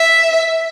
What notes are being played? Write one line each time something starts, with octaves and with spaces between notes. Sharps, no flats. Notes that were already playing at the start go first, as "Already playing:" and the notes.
Already playing: E5